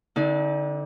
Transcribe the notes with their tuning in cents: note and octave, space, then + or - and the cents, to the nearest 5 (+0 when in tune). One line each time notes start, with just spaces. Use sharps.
D3 -5 C4 +0 D#4 +40